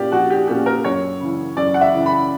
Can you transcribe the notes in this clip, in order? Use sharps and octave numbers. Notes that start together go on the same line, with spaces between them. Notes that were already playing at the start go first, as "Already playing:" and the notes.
Already playing: A#2 A#3 C#4 G4 D5
A#1 F#4
G4
A#2 A#3 C#4 G4
A#4
F#2 C#5
C#3 E3
F#2 D5
F#5
E5
C#3 E3
B5